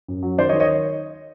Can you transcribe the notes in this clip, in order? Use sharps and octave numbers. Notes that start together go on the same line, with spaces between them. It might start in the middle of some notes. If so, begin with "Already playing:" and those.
F#2
F#3
D#3 C5 D5
C#5 D#5
D#3
C#5 D#5